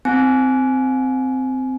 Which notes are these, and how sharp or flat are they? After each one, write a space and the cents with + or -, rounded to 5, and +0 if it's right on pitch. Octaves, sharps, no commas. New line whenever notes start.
C4 -10 G#5 +25